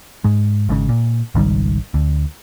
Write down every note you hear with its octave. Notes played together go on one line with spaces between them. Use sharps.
G#2 G#3
G#1 G#2 C#3
A#2
G#1 C#2 D#3 G3
D2